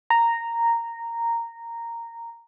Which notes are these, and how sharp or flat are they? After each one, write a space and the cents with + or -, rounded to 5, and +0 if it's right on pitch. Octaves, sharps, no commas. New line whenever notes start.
A#5 -10